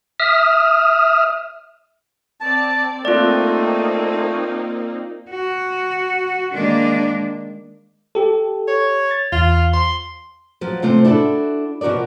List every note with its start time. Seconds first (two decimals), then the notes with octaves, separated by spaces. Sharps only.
0.20 E5 D#6 F6
2.40 C4 D5 A5
3.05 A3 A#3 C4 D#4 F4 D5
5.30 F#4
6.53 D#3 G#3 A#3 D4
8.15 G4 A4
8.68 C#5
9.11 A6
9.32 E2 F4
9.74 C6
10.61 F3 F#3 F4
10.82 C3 A3 C4 F4
11.05 D4 E4 F#4 A4
11.81 B2 F3 F#4 A#4 D5